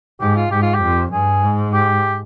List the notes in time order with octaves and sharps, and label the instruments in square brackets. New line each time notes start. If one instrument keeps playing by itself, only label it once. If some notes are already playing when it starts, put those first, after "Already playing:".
[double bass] G#2 [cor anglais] G4
[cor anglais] F4
[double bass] G#2 [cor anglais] G4
[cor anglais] F4
G4
[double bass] F2
[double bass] G2 [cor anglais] G#4
[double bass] G#2
[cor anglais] G4